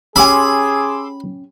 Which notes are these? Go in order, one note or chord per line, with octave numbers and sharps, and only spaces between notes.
C#4 G4 G#4 G#5 B5 C6 D6 E6